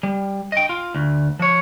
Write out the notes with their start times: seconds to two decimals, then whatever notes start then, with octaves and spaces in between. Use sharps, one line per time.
0.03 G3
0.52 D#5 G5
0.69 F4
0.95 D2
1.39 F3 C#5